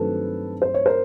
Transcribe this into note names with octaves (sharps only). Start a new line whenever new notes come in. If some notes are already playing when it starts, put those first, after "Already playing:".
Already playing: G2 D#3 F#3 A3 C4 A4 B4
C5
C#5
A#4 C5